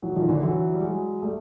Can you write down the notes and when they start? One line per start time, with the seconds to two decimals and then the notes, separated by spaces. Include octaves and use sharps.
0.02 E3 F#3
0.16 D#3 F3
0.29 D3 E3
0.43 E3 F#3
0.74 G3
0.82 F#3 G#3
1.22 G3 A3